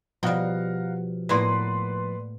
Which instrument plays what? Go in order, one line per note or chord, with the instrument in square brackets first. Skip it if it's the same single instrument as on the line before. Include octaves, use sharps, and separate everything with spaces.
[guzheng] B2 G3 [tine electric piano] F3 [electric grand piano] F5 F#5 A#5
[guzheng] A2 A#3 B3 [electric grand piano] B4 D5 C6